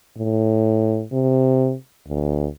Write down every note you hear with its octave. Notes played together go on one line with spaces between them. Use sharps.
A2
C3
D2